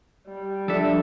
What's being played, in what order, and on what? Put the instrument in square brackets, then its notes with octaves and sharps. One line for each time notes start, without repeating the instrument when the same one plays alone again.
[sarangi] G3
[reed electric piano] F3 [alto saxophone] D4 [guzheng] A4 E5